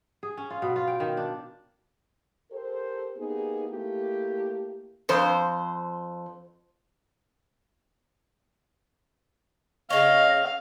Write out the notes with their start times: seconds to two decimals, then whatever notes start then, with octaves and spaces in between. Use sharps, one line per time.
0.23 G#4
0.37 C#4
0.50 F4
0.62 B2
0.76 F4
0.88 G5
1.00 D#3
1.17 D4
2.52 G4 A4 A#4 C5
3.17 A#3 B3 D#4 G4 G#4
3.69 A3 A#3 E4 G4
5.09 F2 C5
9.90 C#3 C#5 D#5 F5